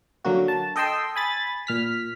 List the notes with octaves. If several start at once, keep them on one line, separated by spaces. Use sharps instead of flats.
D3 F#3 A#3 F#4
A5
A4 D#5 G5 A5 C6 E6
G#5 B5 A6
A#2 F6 B6